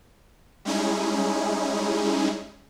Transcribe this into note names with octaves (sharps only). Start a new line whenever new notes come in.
G3 G#3 C#4 D#4 E4 G#4